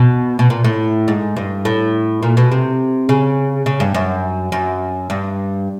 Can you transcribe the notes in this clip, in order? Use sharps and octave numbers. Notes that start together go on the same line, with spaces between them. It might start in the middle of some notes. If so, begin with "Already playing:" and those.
Already playing: B2
B2
A#2
A2
G#2
G2
A2
A#2
B2
C3
C#3
C#3
G2
F#2
F#2
G2